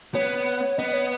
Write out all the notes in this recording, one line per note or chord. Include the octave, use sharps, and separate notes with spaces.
B3 C#5
B3 D#5
C#5